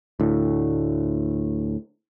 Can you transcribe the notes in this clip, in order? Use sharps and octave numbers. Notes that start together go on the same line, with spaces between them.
D2 A2